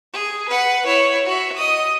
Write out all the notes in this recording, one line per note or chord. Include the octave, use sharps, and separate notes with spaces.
G#4
B4 F#5
E4 C#5
F#4 E5
D#5 D#6